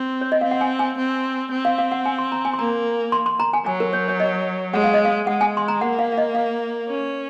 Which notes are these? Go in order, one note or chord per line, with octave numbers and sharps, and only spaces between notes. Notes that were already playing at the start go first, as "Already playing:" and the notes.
Already playing: C4
C#5
D#5
C4 F5
F#5
G#5
G#5
C4
C4
F5
F5
F#5
G#5
C6
A#5
G#5
C6
A#3 A#5
C6
C6
A#5
G#5
F#3 G#5
A#4
C#5
C#5
D#5
G#3 F#5
F5
D#5
F5
G#3 F#5
G#5
C6
A#5
A#3 F#5
F5
F5
D#5
F5
C#4